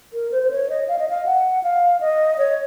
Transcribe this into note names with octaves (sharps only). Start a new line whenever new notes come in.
A#4
C5
C5
C#5
D#5
F5
D#5
F5
F#5
F5
D#5
C#5